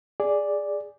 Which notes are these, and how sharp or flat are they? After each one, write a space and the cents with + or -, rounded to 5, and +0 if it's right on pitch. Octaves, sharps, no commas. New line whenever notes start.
G#4 -5 D5 +0